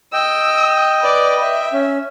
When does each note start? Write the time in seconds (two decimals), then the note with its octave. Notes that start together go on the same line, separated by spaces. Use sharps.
0.13 D#5 G5 E6
1.01 B4 D5
1.40 E5
1.73 C#4